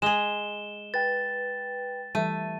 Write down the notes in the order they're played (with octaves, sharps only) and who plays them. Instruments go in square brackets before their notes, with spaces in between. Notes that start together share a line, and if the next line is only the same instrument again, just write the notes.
[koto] G#3 G#4 [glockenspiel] E7 G7
[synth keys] B4 G5 [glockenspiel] A6
[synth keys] E3 G3 [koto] A3 [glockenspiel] D#7